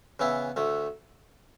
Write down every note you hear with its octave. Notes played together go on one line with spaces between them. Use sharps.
C#3 E3 B3 E4
D2 D3 A3